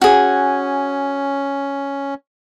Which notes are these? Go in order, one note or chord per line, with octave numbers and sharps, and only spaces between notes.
C#4 F#4 G#4